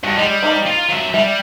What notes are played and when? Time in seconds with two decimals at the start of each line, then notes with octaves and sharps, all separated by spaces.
0.03 G2 F#4
0.17 G3 G#3
0.43 A#3 D#4 C5
0.66 F4
0.89 F#3 E5
1.14 G3 E5